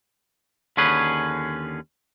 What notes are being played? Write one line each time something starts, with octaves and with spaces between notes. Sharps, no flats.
D#2 D3 C#4 G#4 B4